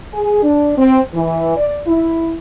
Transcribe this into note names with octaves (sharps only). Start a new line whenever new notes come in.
G#4
D4
C4
E3
D5
E4